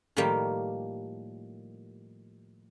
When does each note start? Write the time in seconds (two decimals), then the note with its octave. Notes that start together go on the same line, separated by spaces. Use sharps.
0.17 A2 D#3 F3 G3 A#3 G4